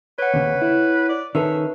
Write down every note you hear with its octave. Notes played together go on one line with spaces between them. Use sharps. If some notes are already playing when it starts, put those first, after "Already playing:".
B4 C#5 F#5
D#2 C#3
E4
D5
D#3 C#4 A4 B4 E5